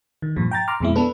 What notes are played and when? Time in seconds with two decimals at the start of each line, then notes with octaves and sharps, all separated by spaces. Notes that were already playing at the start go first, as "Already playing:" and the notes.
0.22 D#3
0.36 G2 A#2 F3
0.51 G5 A#5 A6
0.68 A#5 C6 D6 F6
0.80 F2 B2 G#3 C4 E4
0.96 B3 D4 A4 B4